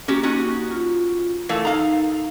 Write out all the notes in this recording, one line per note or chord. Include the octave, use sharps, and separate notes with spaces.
A#3 C#4 F#4 G4
C#4 D#4 F#4
F4
E3 A3 A4 A#4 F5
D#4 F5 A#5